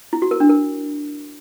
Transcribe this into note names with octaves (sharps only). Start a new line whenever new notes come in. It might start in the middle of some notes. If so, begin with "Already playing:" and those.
E4
F#4
A#4
D4
A#4